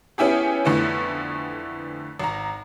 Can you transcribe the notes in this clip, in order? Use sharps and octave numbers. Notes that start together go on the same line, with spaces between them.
B3 C#4 E4 G4 G#4
F2 D3 E3 A3 B3
G#1 A#5